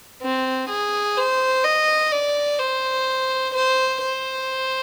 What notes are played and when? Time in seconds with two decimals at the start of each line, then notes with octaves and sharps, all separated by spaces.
0.22 C4
0.69 G#4
1.17 C5
1.64 D#5
2.12 D5
2.59 C5
3.55 C5
4.02 C5